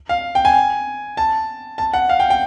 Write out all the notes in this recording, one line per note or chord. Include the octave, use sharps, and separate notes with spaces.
F5
G5
G#5
A5
A5
F#5
F5
G5
G5